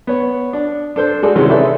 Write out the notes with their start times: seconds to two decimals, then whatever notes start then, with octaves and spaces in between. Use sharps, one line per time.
0.07 B3 C#5
0.53 D4
0.96 D4 A4 C5
1.22 G#3 F#4 G#4 A4 D5
1.36 C3 D#3 E3 G#3 C#4
1.50 G#4 A4 B4 C#5 D5 E5